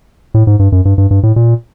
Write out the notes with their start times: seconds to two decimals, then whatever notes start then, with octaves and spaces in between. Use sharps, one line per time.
0.34 A2
0.47 G#2
0.59 G2
0.72 F#2
0.85 G2
0.98 G2
1.11 G2
1.23 A2
1.36 A#2